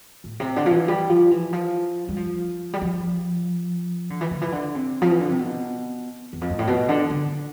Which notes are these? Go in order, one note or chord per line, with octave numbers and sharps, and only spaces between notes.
A2
C3
D3
F3
E3
G3
F3
E3
F3
G3
F3
G3
F3
D3
E3
D3
E3
D3
C3
F3
E3
D3
C3
B2
E2
F2
G2
A2
B2
D3
D3